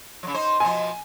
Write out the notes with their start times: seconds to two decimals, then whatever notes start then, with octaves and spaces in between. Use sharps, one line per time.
0.23 C#3 F3
0.34 D#4 C5
0.60 B2 F3 G#5